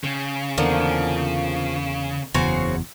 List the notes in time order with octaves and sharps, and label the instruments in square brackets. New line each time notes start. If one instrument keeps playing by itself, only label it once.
[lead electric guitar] C#3 [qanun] G5
[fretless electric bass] E2 [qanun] D3 A#3 F#5 [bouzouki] F3
[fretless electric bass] F#1 E2 [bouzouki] C#3 F#4 C5